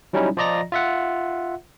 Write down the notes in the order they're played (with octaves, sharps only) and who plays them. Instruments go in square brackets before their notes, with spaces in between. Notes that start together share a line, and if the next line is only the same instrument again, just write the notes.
[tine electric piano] F#3 G3 C#4 D#4 E4
F3 F4 D5 D#5 A#5 A#6
F4 E5 F#5